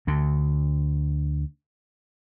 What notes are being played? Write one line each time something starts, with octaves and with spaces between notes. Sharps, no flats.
D2 D3